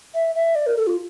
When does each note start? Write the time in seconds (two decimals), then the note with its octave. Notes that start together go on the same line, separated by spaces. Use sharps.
0.14 E5
0.35 E5
0.55 D5
0.67 A#4
0.76 A4
0.87 F4